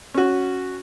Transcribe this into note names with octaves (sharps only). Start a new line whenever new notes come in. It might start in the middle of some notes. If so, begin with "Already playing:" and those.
C#4 F#4